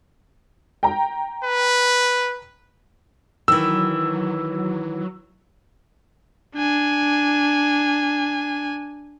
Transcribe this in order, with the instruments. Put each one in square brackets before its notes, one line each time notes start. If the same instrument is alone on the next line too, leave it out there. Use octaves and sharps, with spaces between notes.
[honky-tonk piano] G5 A#5
[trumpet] B4
[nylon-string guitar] D#3 E3 [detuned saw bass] F#3 [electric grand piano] E6
[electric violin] D4 G#5